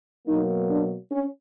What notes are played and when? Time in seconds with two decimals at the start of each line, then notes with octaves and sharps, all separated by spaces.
0.26 B2 F#3 A#3 D#4
0.69 D4
1.10 C#4